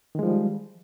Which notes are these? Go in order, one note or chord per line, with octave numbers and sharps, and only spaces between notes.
D#3 F3 G3 G#3